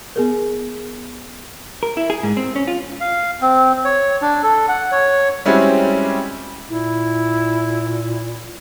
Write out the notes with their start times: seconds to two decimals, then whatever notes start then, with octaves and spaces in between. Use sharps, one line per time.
0.16 B3 G#4 A#4
1.83 A#4
1.97 E4
2.10 G#4
2.23 G#2
2.37 C4
2.56 C#4
2.68 F4
3.01 F5
3.41 C4
3.85 C#5
4.21 D4
4.43 A4
4.68 F#5
4.91 C#5
5.45 G3 G#3 C4 C#4 E4 F#4
6.69 A#2 E4